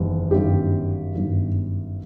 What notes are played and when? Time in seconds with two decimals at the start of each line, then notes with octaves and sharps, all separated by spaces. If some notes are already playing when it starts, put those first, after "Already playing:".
Already playing: F#1 E2 D#3 G3
0.31 G1 F#2 D#3 G4
1.15 G1 F#2 D#3